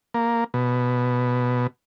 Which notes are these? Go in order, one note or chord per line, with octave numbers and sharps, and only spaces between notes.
A#3
B2